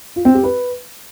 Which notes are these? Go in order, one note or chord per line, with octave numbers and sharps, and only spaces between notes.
F4
C4
G4
B4